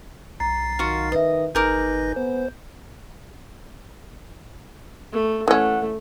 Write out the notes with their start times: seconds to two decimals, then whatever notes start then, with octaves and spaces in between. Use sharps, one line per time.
0.40 B1 A#5 A6 C7
0.79 D#3 F4 F#4 F5
1.12 B4 D#5 E5
1.55 G1 D#4 G#4 A#4 B4 D6 G6 A#6
2.16 B3 C5
5.12 A3
5.48 E3 A3 C#4 F#5